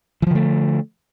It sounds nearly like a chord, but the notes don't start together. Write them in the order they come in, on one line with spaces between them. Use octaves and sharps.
E3 F3 D3 A3